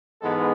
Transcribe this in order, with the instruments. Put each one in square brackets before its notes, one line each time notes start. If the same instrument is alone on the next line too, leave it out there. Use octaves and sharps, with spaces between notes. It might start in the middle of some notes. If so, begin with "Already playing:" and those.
[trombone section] G#2 E3 G#3 B3 A4